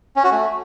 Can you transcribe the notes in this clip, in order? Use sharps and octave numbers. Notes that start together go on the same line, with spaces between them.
C#4
F#4
A3